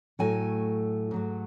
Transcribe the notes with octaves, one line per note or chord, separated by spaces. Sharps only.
A2 F#3 A3 G#5
G#2 F#3 A3